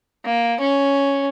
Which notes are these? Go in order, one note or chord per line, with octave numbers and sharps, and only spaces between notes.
A#3
C#4